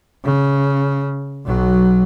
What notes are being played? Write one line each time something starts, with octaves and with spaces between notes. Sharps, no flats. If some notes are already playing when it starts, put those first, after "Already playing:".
C#3
B1 F#3